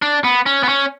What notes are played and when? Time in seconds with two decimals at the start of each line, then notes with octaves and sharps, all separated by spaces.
0.02 D4
0.24 B3
0.46 C#4
0.63 B3
0.69 C#4